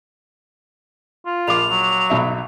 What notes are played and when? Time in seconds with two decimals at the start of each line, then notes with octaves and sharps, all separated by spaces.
1.26 F4
1.47 A#1 F5 D6 F7
1.70 F#3
2.10 B1 B2 E5